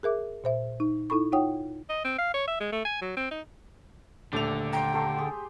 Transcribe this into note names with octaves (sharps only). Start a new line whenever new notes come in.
G#4 A#4 E5 D6
A#2 C5 E5
D#4
D#4 E4 A4 B5 C#6
D#4 F4 C#5 F#5 G5 D#6
D#5
C4
F5
C#5
E5
G#3
A3
G#5
F#3
C4
D#4
D#1 D3 A3 D5 G5 F7
G5 A#5 C6
G4 A4 C6
G4 G#4